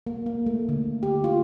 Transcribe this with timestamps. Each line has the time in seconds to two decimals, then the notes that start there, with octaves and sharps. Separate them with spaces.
0.07 A#3
0.26 A#3
0.46 A3
0.69 D3
1.03 G4
1.24 F4